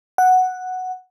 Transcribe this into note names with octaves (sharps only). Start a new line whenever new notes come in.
F#5